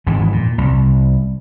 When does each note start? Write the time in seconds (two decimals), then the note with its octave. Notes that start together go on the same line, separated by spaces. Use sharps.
0.07 G#1 F2 G#2 E3
0.32 A#2
0.58 C2